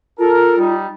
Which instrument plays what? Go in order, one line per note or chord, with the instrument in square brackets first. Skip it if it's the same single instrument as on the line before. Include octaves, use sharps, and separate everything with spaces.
[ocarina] F4 [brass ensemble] A4 A#4
[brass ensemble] G3 D#4